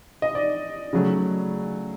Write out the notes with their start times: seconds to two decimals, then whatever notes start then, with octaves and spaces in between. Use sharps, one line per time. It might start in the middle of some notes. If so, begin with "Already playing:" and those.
0.22 D#5
0.35 D5
0.93 C#3 F#3 A3